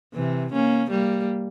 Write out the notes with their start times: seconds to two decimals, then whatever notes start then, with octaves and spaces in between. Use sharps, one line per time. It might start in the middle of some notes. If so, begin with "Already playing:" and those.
0.14 C3 E3
0.53 A#3 C#4
0.90 G3 A#3